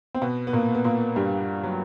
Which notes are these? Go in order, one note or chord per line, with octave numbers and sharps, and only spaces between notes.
C4
B2 B3
B3
A#2 A#3
B3
A#2 A#3
G2 G3
F#3